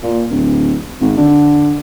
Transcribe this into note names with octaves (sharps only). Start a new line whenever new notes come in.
A#2
D1
G#1
D3